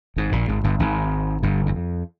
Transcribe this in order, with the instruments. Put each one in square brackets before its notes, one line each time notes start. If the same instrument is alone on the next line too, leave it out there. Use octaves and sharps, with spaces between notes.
[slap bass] G#1 G#2
A#1 A#2
G#1 G#2
G1 G2
G#1 G#2
G1 G2
E2
F2